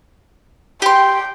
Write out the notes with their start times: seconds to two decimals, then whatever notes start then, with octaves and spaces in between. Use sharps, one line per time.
0.82 G4 G5 C6